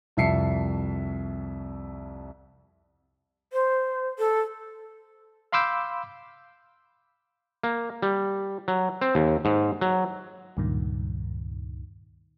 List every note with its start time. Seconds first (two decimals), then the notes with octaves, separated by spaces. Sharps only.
0.17 C2 F2 E5 A5 C7 C#7
3.53 C5
4.19 A4
5.52 F5 B5 C6 D6 E6 G6
7.64 A#3
8.02 G3
8.68 F#3
9.01 C4
9.15 D#2
9.45 G#2
9.81 F#3
10.57 C#2 G2 A#2 D#3